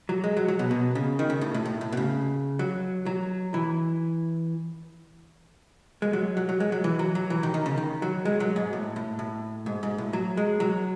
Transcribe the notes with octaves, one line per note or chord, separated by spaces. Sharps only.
F#3
G#3
F#3
F#3
B2
B2
C#3
D#3
C#3
A2
A2
A2
A2
B2
C#3
F#3
F#3
E3
G#3
F#3
F#3
F#3
G#3
F#3
E3
F#3
F#3
E3
D#3
D#3
C#3
D#3
F#3
G#3
F#3
G#2
A2
A2
A2
G#2
G#2
A2
F#3
G#3
F#3